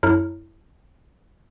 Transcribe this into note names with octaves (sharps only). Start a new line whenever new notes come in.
F#2 E4 A4 C#5 A#5 F6